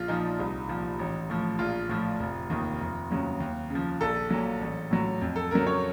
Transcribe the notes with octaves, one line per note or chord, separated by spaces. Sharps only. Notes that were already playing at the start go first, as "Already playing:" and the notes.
Already playing: A#1 F4
A#2 F3 D#4
C2
A#2 F3
A1
A2 F3
A#1 F4
A2 F3
F1
D#2 D#3
F1
D#2 C#3 F#3
D#2
C#3 F3
A#1 A4
A#2 F#3
A1
A2 F#3
F2
A4
C#3 F#3 A#4
C#5